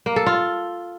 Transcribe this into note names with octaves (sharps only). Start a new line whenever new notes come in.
A#3
A4
F4